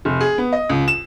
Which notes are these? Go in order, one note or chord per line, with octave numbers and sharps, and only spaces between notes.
F1
G#4
B3
D#5
C#2
E7